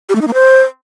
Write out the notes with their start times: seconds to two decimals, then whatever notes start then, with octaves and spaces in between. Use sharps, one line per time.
0.09 G4
0.15 A3
0.21 D#4
0.27 A#3
0.34 C5